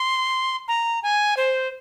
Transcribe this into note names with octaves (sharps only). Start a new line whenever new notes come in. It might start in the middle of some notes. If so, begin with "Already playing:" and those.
Already playing: C6
A#5
G#5
C5